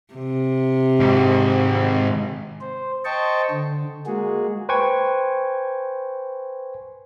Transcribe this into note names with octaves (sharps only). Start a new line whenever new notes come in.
C3
G#2 D#3
C5
C5 D#5 G5 A5 C#6
D3
G#3 A#3 F#4 G#4
B4 C5 G5 G#5 C#6 G#6